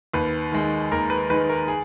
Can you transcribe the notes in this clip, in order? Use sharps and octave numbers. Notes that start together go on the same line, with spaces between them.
D#2 B4
D#3 G#3
D#2 A#4
B4
D#3 G#3 B4
A#4
G#4